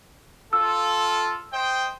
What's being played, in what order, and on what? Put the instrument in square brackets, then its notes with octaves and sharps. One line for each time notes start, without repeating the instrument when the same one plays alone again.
[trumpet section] F4 A4 [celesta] E6
[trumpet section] C5 D#5 G5